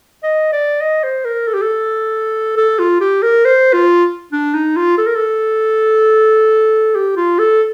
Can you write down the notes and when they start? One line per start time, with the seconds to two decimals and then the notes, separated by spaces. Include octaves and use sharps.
0.23 D#5
0.52 D5
0.81 D#5
1.04 C5
1.25 A#4
1.47 A4
1.54 G4
1.62 A4
2.57 A4
2.79 F4
3.01 G4
3.22 A#4
3.45 C5
3.73 F4
4.32 D4
4.54 D#4
4.76 F4
4.98 A4
5.07 A#4
5.15 A4
6.95 G4
7.16 F4
7.39 A4